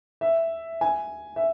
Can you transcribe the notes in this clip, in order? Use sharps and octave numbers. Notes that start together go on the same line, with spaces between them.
E5
G#5
E5